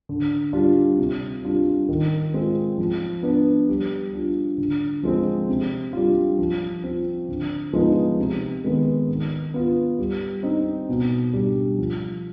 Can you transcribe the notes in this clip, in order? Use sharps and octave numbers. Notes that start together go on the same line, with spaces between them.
D3
G3 D4 F4
C3
G3 D4 F4
D#3
G#3 C4 F4
F3
B3 D4
G3
D4 F4
D3
F3 G#3 C4
C3
G3 D4 F4
F3
C4 F4
D3
F3 G#3 B3 D#4
C3
D#3 G#3 B3
D#3
B3 F4
G3
C4 D#4
B2
G3 D4
F3